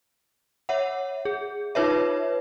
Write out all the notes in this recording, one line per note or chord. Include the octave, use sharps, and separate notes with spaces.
C#5 E5 F#5
G#4
D#4 F4 B4 C#5 E5